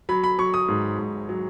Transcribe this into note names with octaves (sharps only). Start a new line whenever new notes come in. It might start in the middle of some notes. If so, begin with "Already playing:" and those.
F#3 B5
B5
F#3 C#6
D#6
G#2
G#2
F#3